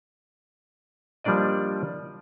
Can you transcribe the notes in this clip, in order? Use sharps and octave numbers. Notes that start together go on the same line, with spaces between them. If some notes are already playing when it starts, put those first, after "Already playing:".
F3 G3 A#3 D4 D5 D#5